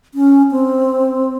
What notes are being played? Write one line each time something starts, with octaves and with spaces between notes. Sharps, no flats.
C#4
C4